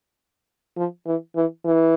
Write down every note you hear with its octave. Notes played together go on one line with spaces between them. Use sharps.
F3
E3
E3
E3